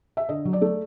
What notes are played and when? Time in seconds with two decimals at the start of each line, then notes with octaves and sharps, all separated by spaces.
0.17 E5
0.29 D3 D#5
0.45 F#3
0.53 D5
0.61 A3